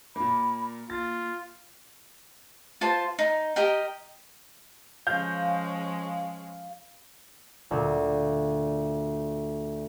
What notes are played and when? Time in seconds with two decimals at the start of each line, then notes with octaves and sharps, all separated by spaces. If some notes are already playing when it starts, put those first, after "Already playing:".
0.16 A#2 A#3 B5
0.90 A#3 F4 A6
2.81 F4 C5 A5
3.19 D#4
3.56 G4 A#4 D#5 G5
5.07 F3 G#3 C#4 F5 G6
7.71 D2 A#2